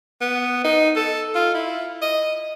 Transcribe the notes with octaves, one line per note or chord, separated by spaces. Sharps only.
B3
D#4
A4
F4
E4
D#5